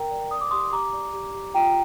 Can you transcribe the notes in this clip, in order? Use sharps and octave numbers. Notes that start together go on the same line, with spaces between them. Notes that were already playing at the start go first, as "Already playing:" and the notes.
Already playing: A#4 G5 A#5
D5
D5 D#6
D6
G4 C6 D#6
G4 A#5 D6
D5
G4
G4
F4 G5 A#5